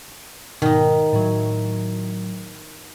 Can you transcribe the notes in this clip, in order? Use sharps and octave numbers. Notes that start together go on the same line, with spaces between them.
G#2 B2 D#3 D#4
A2 F#3